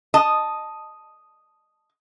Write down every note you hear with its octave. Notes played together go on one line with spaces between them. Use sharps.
D#5 A5